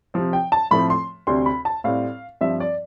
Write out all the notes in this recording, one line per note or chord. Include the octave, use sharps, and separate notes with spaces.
C3 F3 C4
G5
A5
A2 F3 A3 C4 B5
C6
D2 C3 G3 C4 C6
B5
A5
A2 G3 C4 F5
G2 F3 C4 E5
D5